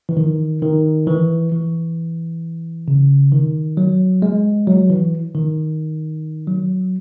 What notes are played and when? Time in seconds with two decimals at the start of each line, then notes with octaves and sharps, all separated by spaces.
0.09 E3
0.17 D#3
0.62 D#3
1.07 E3
1.52 E3
2.88 C#3
3.32 D#3
3.77 F#3
4.22 G#3
4.68 F#3
4.90 E3
5.35 D#3
6.48 F#3